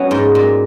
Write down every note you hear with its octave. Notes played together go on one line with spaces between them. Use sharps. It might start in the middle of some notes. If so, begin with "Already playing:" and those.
Already playing: F#3 B3 C#4 D#4
G#2
A#2